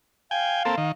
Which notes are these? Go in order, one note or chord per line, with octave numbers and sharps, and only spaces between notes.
F5 G5 G#5
A#3 C4 A4
D#3